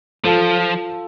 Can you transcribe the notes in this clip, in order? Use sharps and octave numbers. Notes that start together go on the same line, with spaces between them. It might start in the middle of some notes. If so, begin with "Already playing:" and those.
F3 F4 A4